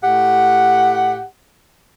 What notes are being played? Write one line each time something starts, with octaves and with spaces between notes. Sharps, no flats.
A2 G4 F#5